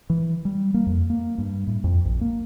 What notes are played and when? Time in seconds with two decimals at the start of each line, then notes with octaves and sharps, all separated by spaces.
0.10 E3
0.45 G3
0.74 A#3
0.86 F2
1.10 A#3
1.38 G2
1.67 A2
1.84 F2
2.05 A#1
2.21 A#3